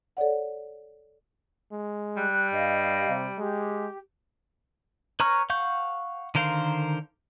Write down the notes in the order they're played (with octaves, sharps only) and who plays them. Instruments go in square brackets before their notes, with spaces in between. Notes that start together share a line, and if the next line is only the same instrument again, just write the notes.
[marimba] A4 C#5 D5 F#5
[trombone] G#3
[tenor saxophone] G3 [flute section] F#6
[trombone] G2 [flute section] D#5 F5
[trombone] C3
[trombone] G#3 [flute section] G4
[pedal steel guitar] B4 C#5 A#5 C#6 F6
F5 F#5 C#6 G6
D3 D#3 A#4 C5 F5